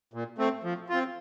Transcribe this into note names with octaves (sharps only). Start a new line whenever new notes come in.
A#2
A3 C4
F3
C4 F4